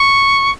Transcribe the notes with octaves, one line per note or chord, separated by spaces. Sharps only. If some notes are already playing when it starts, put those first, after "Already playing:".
Already playing: C#6